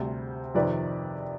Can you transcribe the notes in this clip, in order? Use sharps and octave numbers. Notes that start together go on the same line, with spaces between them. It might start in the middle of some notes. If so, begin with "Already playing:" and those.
Already playing: D2 C3 G3 C5
F2 C3 D#3 B4 D5